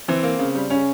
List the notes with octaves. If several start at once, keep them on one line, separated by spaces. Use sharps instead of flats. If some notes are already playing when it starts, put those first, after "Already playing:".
E3 C4
A#3
C#3
G3
C#3 C#4